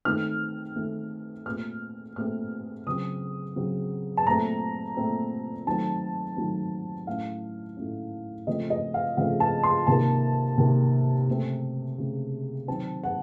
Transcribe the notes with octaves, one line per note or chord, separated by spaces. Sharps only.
D#3 A3 C4 F6
D#3 A3 C4
A#2 A3 C4 F6
A#2 A3 C4 F6
C#3 F#3 C4 D#6
C#3 F#3 C4
A5
A#2 A3 C4 A#5
A#2 A3 C4
D#3 F#3 A3 C4 A5
D#3 F#3 A3 C4
A2 A3 C#4 F5
A2 A3 C#4
C#3 F3 A3 C4 D#5
D#5
F5
C#3 F3 A3 C4 F5
A5
C6
C3 D#3 A#3 A5
C3 D#3 A#3
C#3 A3 C4
C#3 A3 C4
D#3 F#3 C4 A5
F#5